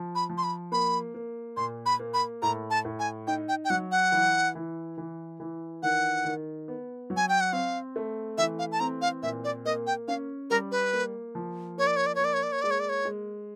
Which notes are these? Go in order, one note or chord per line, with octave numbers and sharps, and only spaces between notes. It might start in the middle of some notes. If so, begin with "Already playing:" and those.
Already playing: F3
B5
F3
C6
B5
A#3 B5
A#3
A#2 C6
B5
A#3
B5
A2 A#5
A5
A2
G#5
D#4 G5
G5
G5
F#3 F#5
F#5
E3
E3
E3
E3
D#3 F#5
D#3
B3
F#3
G#5
G5
F#5
C4 F5
A3
E3 E5
F5
A5
C4 A#5
F5
A#2 E5
D5
A#3 D#5
G5
C#4 F5
G3 A#4
B4
A#3
F3
A#3 C#5
D5
C#5
D5
C#5
A#3 D5
C#5
D5
C#5
G#3 D5
C#5
D5
C#5
G#3